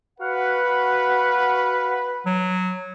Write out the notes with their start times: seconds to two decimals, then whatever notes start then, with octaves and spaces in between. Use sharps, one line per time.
0.20 F#4 B4 F5 F#5
2.26 F#3